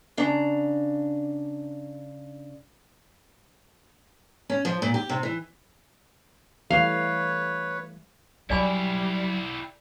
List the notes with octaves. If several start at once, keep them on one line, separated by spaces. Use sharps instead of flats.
C#3 D4 A#5
C#4
F3
A#2
G4
C3
E3
E3 G3 A3 B4 C#5 F5
F#3 G3 E4 G4 D5 G#5 B5